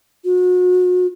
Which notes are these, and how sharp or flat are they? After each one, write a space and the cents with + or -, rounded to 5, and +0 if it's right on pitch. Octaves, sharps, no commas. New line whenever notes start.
F#4 -35